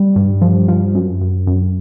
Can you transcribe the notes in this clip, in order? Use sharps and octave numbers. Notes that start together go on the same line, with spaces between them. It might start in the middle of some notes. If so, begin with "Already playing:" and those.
Already playing: G3
G2
F3
F3
F#2
F#2
F#2